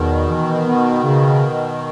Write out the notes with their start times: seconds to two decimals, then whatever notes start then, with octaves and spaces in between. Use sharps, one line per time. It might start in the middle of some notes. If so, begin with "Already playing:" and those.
Already playing: E2 B2 D#3
0.30 E3
0.66 B3
1.03 C#3